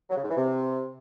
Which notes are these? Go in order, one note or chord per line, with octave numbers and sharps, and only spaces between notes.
F#3
C#3
G#2
E3
C3